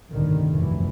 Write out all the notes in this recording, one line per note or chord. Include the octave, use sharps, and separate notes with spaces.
G1 C2 A2 D3 D#3
F1 F#2 E3